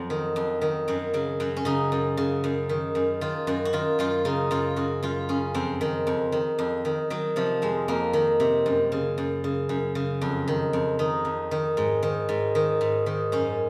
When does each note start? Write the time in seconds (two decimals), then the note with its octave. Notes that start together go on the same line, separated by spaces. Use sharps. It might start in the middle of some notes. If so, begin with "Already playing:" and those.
Already playing: F2 F#3
0.10 D#3
0.36 F2
0.61 D#3
0.88 F#2 F#3
1.14 C#3 F#3
1.40 F#2 F#3
1.57 C#4
1.65 C#3 D#4
1.92 F#2
2.17 C#3
2.44 F#2
2.69 D#3
2.95 F#2
3.21 D#3 F4
3.47 F#2 F#4
3.65 F#4
3.73 D#3 F4
3.99 F#2 F4
4.25 C#3 D#4
4.51 F#2 F4
4.76 C#3 F#4
5.03 F#2 F4
5.29 C#3 C#4
5.55 F2 C4
5.81 D#3
6.07 F2
6.32 D#3
6.59 F2
6.85 D#3
7.10 D#3 F#3
7.36 C3 F3
7.62 F2 G#3
7.88 F2 A#3
8.13 D#3
8.40 C3
8.66 F#2
8.92 C#3
9.18 F#2
9.44 C#3
9.69 F#2
9.95 C#3
10.22 F2
10.48 D#3
10.73 F2
10.99 D#3 D#4
11.25 F2
11.51 D#3
11.77 G#2
12.03 D#3
12.29 G#2
12.55 D#3
12.81 G#2
13.06 D#3
13.32 F#2 C#4